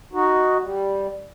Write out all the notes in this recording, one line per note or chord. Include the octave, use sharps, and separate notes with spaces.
D#4 F#4
G3